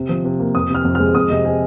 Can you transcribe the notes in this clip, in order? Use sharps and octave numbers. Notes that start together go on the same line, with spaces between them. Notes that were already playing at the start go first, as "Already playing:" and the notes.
Already playing: C3
F3
C3
A#3
F2 D#6
C3 F6
F2
F6
G#3
F2 D#6
C3 D#5
G#4